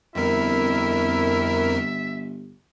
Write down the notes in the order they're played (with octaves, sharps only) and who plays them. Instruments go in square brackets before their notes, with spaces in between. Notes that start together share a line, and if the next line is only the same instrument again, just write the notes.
[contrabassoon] G1 [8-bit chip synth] F2 A#4 [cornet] E4 [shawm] E5